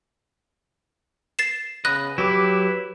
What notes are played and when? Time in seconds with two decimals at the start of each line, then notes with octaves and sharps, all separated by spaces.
1.39 A6 C7 E7
1.85 C#3 B3 B4 D#5 F#6
2.18 F#3 E4 G4 B4 D6